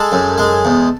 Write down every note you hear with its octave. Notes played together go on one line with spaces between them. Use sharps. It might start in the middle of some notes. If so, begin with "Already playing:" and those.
Already playing: G#3 A4
F#2
G#3
E2